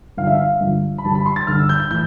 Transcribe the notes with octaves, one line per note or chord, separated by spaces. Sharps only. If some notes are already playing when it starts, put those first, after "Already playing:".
G2 D3 F3 F5
E5
F5
G2 D3 F3
B5
G2 D3 G3 A5
B5
C6
A6
G2 D3 G3 F6
E6
G6
G6
A2 E3 G6